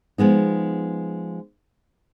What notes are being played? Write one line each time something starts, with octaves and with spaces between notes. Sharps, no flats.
F3 G#3 B3 D#4